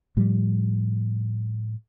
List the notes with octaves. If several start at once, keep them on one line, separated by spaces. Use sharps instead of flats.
A2 F3 G3